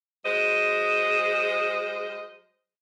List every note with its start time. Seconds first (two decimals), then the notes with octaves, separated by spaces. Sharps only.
0.24 F#3 G#3 C5 D#5